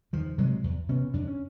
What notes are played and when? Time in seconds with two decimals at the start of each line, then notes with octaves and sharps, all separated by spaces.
0.13 E2 D#3 F3
0.38 C3 F#3 G#3
0.64 E2
0.89 C3 B3 C#4
1.14 F2 D4
1.28 C#4